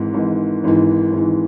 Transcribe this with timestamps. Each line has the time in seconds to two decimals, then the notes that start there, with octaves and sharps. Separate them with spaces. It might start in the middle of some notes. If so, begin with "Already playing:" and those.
Already playing: G#1 G#2 E3
0.14 G#1 G#2 E3
0.64 G#1 G#2 E3
1.13 G#1 G#2 E3